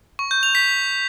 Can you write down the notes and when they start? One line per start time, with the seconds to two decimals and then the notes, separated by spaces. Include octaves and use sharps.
0.19 C#6
0.31 G6
0.43 F7
0.55 B6